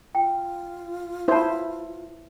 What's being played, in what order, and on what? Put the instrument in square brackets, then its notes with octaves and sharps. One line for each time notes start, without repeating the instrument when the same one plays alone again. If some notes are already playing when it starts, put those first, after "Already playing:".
[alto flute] F4 [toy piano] G5
[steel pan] E4 C5 [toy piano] C#5 A5